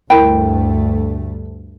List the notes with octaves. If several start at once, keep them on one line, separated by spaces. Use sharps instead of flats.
D2 G2 A3 E4 A#4 G5 B5